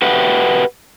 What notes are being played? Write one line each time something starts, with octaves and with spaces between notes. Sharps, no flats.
F#4 G4 B4 E5 F#5 G5